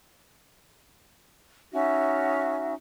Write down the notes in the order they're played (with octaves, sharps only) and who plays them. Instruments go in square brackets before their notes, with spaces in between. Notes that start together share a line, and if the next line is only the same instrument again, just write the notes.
[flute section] C#4 D#4 F#4 E5